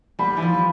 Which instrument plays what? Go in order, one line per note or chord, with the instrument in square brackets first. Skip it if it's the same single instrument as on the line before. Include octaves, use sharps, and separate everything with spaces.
[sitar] G3 [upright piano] B5
[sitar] E3
F3